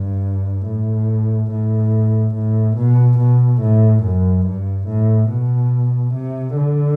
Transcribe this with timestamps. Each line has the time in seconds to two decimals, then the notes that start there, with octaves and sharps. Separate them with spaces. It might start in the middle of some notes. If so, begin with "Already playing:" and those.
Already playing: G2
0.67 A2
1.51 A2
2.34 A2
2.77 B2
3.19 B2
3.61 A2
4.03 F#2
4.46 G2
4.88 A2
5.30 B2
6.14 C3
6.56 D3